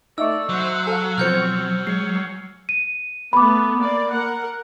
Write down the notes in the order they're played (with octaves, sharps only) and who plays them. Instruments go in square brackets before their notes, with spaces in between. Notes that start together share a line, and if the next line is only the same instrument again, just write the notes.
[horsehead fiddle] A3 D5 [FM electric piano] D#4 E5 C#6 [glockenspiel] E6
[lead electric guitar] F#3 [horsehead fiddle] C5 F#5
[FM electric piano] A4 F5 [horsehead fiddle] F#5 [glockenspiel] G#5
[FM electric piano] B2 F3 C5 [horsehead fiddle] C4 C#5 [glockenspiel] F6 G6 C#7
[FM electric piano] G#3 [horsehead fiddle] C#5 [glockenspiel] C7
[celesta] D#7
[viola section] A3 B3 [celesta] B5 D6
[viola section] A#3 D5
A#4 F#5